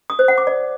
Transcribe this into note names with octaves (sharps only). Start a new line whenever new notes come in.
D#6
C5
F#5
D6
D5